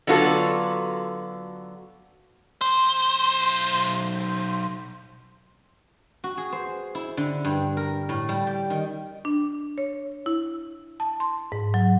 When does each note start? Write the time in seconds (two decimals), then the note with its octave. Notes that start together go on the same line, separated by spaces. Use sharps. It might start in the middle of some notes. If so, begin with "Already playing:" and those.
0.07 D3 F#3 B3 F4 F#4 A4
2.61 B1 C5
6.24 F#4
6.37 G#4
6.52 C5
6.95 E4
7.17 D3
7.45 G2
7.77 A#4
8.09 A2
8.29 G3
8.47 G4
8.70 D#3
9.25 D4
9.78 C#5
10.26 E4
11.00 A5
11.20 C6
11.52 G#2
11.74 F#3